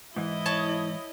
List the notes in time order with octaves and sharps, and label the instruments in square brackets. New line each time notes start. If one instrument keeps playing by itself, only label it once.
[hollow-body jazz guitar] G#2 E3 [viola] E4 D#5
[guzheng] C#5 A5